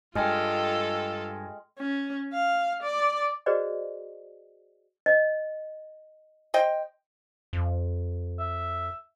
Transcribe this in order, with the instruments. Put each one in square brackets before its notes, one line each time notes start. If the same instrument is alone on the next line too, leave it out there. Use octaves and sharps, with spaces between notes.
[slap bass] G2 [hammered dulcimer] G#3 [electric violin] F4 A4 [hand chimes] G5 G#5 F6
[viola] C#4
F5
D5
[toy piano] F#4 G#4 B4 C5 D5 D#5
D#5
[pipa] C5 D#5 G5
[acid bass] F2
[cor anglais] E5